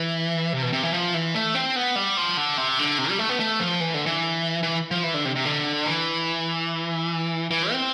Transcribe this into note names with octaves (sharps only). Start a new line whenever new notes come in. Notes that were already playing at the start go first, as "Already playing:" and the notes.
Already playing: E3
C3
B2
C3
E3
F3
E3
A3
C4
B3
G3
F3
D3
C3
D3
C3
G3
A3
B3
A3
F3
E3
D3
E3
E3
F3
E3
D3
C3
C3
D3
E3
E3
C4